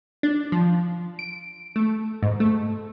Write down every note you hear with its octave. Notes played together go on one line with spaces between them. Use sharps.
D4
F3
D7
A3
G#2
A3